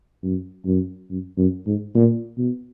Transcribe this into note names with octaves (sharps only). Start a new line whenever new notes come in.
F#2
F#2
F#2
F#2
G#2
A#2
B2